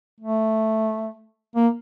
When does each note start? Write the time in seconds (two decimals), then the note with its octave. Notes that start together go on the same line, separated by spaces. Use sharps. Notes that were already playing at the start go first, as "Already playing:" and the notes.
0.20 A3
1.56 A#3